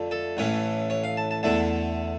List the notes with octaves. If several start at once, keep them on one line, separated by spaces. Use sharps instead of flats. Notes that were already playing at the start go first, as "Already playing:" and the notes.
Already playing: F2 D3 A3
A4
A1 A2 E3 A3 C#4 C#5
C#5
F5
A5
A5
E2 D3 A3 E4 A5